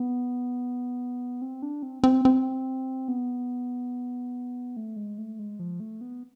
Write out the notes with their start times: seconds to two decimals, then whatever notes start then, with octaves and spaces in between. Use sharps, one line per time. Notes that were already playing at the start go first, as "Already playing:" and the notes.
Already playing: B3
1.42 C4
1.62 D4
1.83 C4
2.04 C4
2.25 C4
3.08 B3
4.77 A3
4.96 G#3
5.18 A3
5.39 G#3
5.59 F3
5.80 A3
6.01 B3